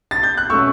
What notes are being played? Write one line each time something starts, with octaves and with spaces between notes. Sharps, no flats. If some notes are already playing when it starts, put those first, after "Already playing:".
A6
G6
F#6
B2 A3 C#4 C#6 E6